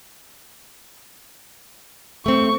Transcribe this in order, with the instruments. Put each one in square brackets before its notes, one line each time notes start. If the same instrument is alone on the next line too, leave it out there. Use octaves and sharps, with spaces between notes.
[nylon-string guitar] A3 C4 [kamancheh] C#6